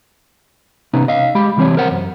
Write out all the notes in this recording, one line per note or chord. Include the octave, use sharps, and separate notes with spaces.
C3 B3 C#4 D#4
D#5 F5
G#3 G4 B5
C2 E3 G3 C4 C#5
A#4 C5 F#5
F#2